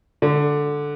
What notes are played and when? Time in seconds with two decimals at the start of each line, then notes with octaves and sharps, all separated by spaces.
0.22 D3